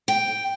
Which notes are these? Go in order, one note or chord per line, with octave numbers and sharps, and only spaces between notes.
G5